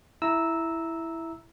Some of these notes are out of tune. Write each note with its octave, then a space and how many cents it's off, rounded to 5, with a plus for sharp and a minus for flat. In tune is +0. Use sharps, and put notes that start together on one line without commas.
E4 +0 A#5 +0 E6 -10